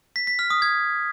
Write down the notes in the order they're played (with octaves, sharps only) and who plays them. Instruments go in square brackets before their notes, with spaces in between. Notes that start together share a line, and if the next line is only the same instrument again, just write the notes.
[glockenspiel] B6
B6
F6
D#6
G#6